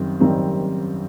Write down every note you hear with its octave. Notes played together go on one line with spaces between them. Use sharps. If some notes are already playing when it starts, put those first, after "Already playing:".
Already playing: F#1 F#2 D#3 G3 C4
F#1 F#2 D#3 G3 C4